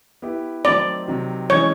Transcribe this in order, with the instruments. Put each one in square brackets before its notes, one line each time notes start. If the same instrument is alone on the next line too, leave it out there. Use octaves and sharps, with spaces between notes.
[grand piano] B3 E4 G4 B4
[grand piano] D#3 F#3 A3 C4 [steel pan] D5
[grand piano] C3 D#3 F#3
[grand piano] E3 G#3 C#4 [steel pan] C#5